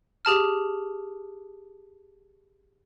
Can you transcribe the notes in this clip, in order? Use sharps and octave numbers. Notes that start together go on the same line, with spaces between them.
G4 G#4 A5 F6